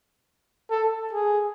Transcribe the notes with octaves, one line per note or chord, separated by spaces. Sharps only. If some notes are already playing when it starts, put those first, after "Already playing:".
A4
G#4